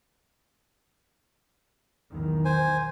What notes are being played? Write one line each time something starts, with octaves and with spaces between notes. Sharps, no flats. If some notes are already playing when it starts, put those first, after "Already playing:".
B1 E2 D#3
C5 G#5